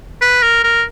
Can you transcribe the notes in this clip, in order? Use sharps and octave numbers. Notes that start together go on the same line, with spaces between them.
B4
A#4
A#4